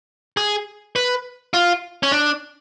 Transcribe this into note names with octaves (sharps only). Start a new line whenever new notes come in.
G#4
B4
F4
C#4
D4